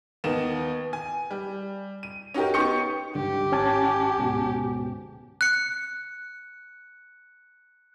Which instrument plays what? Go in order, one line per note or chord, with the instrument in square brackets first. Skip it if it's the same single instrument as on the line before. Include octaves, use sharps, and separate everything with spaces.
[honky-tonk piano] D#2 B3 D#4 A#4 E7
G#5
G3
D#7
C#4 D#4 F#4 G4 A#4
B3 D#4 G4 C#6 G6 C#7
[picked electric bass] C#2 G2 D3 [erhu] G4
[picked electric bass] G#1 [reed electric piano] C#4 G#5 A5
[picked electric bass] D1 G#2 B2
[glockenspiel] F#6 C#7